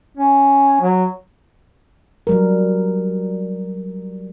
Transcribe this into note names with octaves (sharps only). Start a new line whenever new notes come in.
C#4
F#3
F#3 G3 A#4